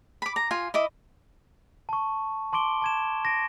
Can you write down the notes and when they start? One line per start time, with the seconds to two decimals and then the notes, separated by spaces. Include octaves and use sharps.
0.22 B5 D6
0.36 A#5
0.51 F4 G#5
0.74 E4 D#5 D6
1.89 A5 C#6
2.53 A5 C6 D6 D7 G7
2.82 A5 G#6 E7
3.25 A#6 D7